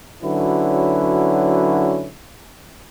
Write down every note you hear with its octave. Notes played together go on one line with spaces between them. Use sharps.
D3 F#3 C#4 E4 F#4 B4